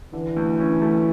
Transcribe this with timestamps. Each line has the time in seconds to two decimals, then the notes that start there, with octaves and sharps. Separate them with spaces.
0.13 D3 E3
0.36 D2
0.60 C#4
0.82 A3